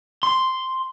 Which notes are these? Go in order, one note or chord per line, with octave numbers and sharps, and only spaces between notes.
C6